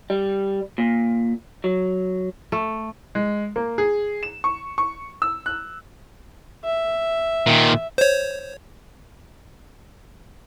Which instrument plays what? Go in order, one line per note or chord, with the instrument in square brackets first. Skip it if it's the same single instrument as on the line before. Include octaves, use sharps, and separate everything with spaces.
[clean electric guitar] G3
A#2
F#3
[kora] A3
[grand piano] G#3
A#3
G#4
E7
C#6
C#6
E6
F#6
[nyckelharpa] E5
[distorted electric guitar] A#2 D#3
[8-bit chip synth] C5 C#5